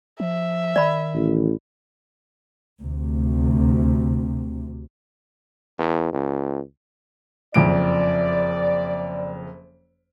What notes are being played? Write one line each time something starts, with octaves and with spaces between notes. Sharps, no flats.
F3 E5
D#3 D5 B5
A1
D2 C3
E2
C#2
F#1 F2 D5 D7